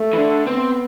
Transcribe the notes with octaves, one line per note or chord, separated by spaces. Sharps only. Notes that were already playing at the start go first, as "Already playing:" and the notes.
Already playing: A3
E3
D3
B3 C4